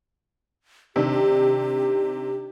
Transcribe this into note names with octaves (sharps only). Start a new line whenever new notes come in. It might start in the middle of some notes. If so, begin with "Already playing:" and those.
C3 D#3 D4 G4